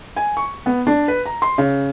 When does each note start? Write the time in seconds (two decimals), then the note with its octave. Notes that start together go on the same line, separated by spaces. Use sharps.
0.16 G#5
0.37 C#6
0.66 B3
0.87 D4
1.08 B4
1.26 A#5
1.42 C6
1.58 C#3